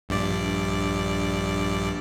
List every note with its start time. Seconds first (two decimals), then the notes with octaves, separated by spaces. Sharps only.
0.09 A#1 G2 D5